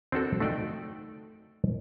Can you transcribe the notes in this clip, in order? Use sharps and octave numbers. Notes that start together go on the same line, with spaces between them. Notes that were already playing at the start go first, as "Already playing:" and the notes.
C4 D4 F#4 A4
A3 D#4 F#4 D5 F5 G5